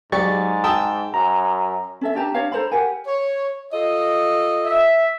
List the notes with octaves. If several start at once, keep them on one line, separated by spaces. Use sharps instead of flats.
G#2 F#3 G4 G#4 D5 C#6 A6
G5 A5 D#6 E6
F#2 A#5
C#4 A4 E5
D4 G4 A5 A#5
D4 C#5 F5
A4 C5 A#5 B5
G4 A#4 F#5 G#5
C#5
F4 A4 D#5
E5